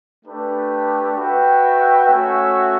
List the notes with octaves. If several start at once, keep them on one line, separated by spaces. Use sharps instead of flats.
A3 D4 G4 B4
F#4 B4 E5 G5
A3 C#4 F#4 C#5 E5